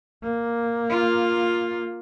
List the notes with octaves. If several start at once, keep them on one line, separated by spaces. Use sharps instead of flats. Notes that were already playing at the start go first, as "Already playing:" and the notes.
A#3
F4